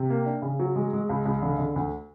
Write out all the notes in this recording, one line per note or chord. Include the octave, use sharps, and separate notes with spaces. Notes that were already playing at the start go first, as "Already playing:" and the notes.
Already playing: C3
A#3
D4
C#3
F#3
G#3
G#3
C#2
C#2
D3
D3
D2